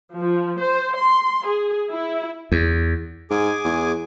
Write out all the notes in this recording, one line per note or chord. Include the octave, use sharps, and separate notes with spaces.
F3
C5
C6
G#4
E4
E2
G#2 G#4 G#5 D6
E2